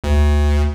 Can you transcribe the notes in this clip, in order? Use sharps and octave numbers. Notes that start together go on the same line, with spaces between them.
D2